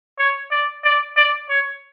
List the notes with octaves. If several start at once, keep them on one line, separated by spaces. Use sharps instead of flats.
C#5
D5
D5
D5
C#5